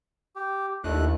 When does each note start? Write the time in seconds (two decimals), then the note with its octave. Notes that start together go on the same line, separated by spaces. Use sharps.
0.36 G4
0.84 D#2 A3 D4 E4 D#5 F#6